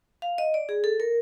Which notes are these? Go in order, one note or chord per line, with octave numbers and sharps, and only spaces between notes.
F5
D#5
D5
G#4
A4
A#4